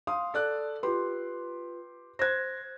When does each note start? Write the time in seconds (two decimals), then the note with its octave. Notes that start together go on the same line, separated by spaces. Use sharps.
0.07 F5 C6 D#6
0.34 A4 D5 F#6
0.83 F4 G4 B4 C6
2.19 C5 F#6 G#6 A#6